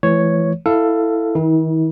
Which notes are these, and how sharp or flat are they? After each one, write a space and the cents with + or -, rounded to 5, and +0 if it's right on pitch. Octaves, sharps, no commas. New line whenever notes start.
E3 +20 A3 -35 C#5 +0
E4 +0 A4 +10 F5 +0
D#3 +40 E4 -40